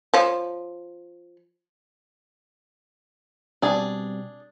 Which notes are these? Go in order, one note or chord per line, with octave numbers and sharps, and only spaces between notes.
F3 C#5
B2 G3 C4 D4 G#4